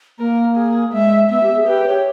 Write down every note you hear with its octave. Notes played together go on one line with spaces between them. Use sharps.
A#3 A#4
G#4
G#3 E5
B3 E5
G4
G#4
G4 B4
C#5